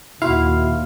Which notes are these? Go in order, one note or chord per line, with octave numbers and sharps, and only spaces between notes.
D#2 A#2 E4 F#4 F5 C6